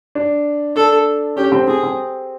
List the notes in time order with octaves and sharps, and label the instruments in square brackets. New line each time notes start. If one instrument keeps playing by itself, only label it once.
[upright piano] D4
[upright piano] D4 [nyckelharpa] A4
[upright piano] C#4 [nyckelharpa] G4
[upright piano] C4
[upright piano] C4 [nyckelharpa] G#4
[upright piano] C4